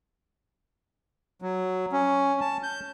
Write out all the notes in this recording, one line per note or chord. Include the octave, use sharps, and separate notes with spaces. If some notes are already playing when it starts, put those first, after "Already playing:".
F#3
C#4
A5
G6